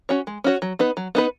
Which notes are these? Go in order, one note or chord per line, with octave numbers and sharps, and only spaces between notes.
C#4 F#4 C#5
G#3
C#4 F#4 C#5
F#3
B3 D#4 B4
F#3
B3 D#4 B4